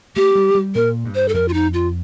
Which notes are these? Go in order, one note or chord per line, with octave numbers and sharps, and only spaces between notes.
A3 G4
G3
G3
A#2 A#4
G2
C5
A4
F2 A#4
F4
D#4
F4